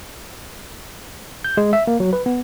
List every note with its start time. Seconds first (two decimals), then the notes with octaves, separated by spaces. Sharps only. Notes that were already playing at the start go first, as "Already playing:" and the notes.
1.45 G6
1.57 G#3
1.73 E5
1.87 A#3
2.00 F#3
2.13 B4
2.26 B3